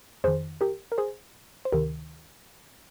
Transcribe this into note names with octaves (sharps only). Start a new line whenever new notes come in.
F2 D#3 G#4 C5
G4 A#4
A#4
G#4 C5
C5
D2 C3 D#3 G4 A#4